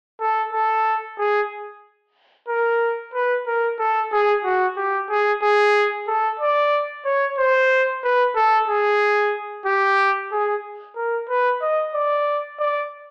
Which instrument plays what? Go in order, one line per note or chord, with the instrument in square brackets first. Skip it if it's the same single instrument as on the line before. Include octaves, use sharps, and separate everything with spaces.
[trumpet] A4
A4
G#4
A#4
B4
A#4
A4
G#4
F#4
G4
G#4
G#4
A4
D5
C#5
C5
B4
A4
G#4
G4
G#4
A#4
B4
D#5
D5
D5